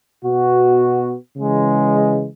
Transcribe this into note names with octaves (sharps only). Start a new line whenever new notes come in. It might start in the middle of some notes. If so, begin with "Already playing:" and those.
B2 B3 F#4
C#3 E3 G#3